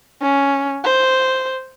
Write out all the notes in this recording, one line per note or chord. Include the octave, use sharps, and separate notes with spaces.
C#4
C5